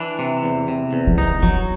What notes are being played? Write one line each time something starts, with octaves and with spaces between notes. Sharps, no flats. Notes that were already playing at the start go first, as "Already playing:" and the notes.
Already playing: E3 D4
C3
E2
C3
E2
E3
D#3 D#4
E3 F#3